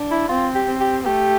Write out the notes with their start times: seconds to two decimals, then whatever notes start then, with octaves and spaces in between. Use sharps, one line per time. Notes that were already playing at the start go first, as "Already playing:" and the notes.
Already playing: D4
0.11 E4
0.29 C4 F4
0.55 G4
0.68 C4
0.81 G4
1.06 A3 G4